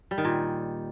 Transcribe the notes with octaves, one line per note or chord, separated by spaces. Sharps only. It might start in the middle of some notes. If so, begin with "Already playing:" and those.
G3
D#3
A#2